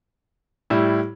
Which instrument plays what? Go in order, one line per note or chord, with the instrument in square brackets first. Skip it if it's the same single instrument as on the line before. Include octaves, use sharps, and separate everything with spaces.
[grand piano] A2 G3 E4